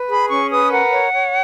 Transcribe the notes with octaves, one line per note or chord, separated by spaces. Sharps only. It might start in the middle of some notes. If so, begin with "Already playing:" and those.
Already playing: B4
G#4 B5
C#4 C#6
B4 D#6
A#4 F#5
C#5
C#5